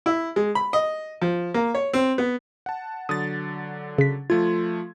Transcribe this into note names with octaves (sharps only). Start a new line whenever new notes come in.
E4
G#3
B5
D#5
F3
A#3
C#5
C4
B3
F#5 A5
D3 F#3 D#6 A6
C#3 B6
F3 A3 F4 G#6